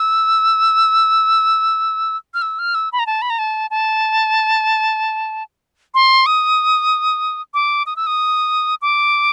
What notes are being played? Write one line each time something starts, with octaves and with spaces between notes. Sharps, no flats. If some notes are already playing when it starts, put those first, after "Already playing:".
Already playing: E6
F6
E6
F6
E6
B5
A#5
A5
B5
A#5
A5
A5
C6
D#6
D6
D#6
E6
D#6
D6